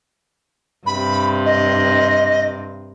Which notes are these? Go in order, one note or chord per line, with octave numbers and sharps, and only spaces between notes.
G2 C3 B5
D#5